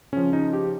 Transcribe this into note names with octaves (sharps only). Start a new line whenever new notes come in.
C#3 F3 C#4
D#4
G4